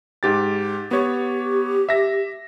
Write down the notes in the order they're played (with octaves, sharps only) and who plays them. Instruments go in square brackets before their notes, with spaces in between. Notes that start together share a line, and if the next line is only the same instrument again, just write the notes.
[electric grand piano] G#2 G4 A6
[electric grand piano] B3 C#5 [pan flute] G4
[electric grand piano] E5 A#6